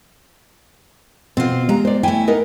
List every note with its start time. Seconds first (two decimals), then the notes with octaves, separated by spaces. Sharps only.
1.37 B2 C4 F4
1.69 G#3 G4 A#5
1.85 C5 D5
2.03 A3 E4 G5 G#5
2.27 B3 D#4 A#4